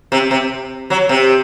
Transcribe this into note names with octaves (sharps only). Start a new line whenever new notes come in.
C3
C3
F#3
C3